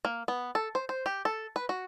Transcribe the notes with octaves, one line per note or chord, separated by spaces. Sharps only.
A#3
B3
A4
C5
C5
G4
A4
B4
F#4